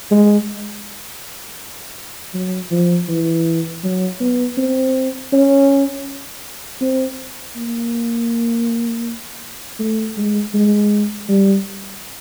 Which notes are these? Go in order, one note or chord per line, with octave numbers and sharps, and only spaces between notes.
G#3
F#3
F3
E3
F#3
B3
C4
C#4
C4
A#3
A3
G#3
G#3
G3